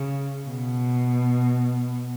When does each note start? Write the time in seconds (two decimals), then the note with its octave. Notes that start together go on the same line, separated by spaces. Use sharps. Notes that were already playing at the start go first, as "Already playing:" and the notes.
Already playing: C#3
0.48 B2